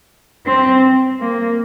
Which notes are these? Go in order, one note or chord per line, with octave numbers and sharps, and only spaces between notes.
C4
A#3